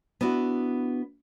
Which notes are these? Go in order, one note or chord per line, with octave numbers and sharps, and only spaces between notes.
B3 D4 E4 F#4